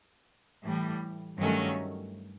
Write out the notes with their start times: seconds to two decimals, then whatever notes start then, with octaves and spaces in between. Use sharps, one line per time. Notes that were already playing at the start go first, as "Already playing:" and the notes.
0.64 A2 E3 G3
1.38 G2 D#3 F#3 A3 C#4